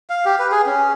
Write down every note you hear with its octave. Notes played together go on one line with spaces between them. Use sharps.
F5
G4
B4
G#4
C#4